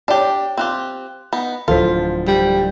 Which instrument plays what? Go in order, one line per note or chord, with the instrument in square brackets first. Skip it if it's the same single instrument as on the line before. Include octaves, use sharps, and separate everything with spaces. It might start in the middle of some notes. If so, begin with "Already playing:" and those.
[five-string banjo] D4 G4 [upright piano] C#5 D5
[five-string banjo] C4 F4 G4 [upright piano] F#6
[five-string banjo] B3 D#4
[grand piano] D1 F3 B6 [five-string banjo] F4 [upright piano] A4 C5
[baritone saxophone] G3